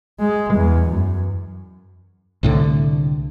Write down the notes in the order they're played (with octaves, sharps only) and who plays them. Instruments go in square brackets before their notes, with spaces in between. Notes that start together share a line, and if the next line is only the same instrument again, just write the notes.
[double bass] G#3
E2
F#2
[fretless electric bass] C2 A2 D3